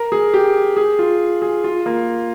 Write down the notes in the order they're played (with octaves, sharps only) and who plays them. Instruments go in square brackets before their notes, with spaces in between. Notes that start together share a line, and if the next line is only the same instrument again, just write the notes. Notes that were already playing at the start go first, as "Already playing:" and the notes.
Already playing: [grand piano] A#4
G#4
G4
G#4
F4
G#4
F4
A#3